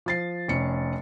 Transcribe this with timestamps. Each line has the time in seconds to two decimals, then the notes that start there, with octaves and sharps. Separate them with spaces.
0.06 F3 A6 C7
0.48 F1 C#4 C#7